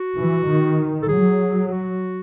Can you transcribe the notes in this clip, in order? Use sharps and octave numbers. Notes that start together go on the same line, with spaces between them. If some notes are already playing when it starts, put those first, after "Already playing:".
Already playing: F#4
E3
D#3
A4
F#3 G#4
G#4
F#4